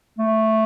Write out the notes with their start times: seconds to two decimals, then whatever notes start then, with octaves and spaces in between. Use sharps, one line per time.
0.18 A3